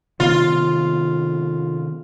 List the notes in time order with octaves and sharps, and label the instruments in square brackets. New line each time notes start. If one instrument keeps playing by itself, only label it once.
[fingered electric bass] C3 D#3 B3 [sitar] F4